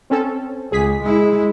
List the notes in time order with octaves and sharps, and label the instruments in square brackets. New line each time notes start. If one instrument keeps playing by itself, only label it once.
[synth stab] C4 C#4 A4
[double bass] C#2 [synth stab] G#4 B6
[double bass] G#3 E4